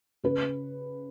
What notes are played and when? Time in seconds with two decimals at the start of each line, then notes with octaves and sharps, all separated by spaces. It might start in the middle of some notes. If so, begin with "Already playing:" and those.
0.24 C#3 B4